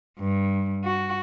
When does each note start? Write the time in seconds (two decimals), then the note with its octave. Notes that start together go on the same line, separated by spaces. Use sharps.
0.19 G2
0.85 F#4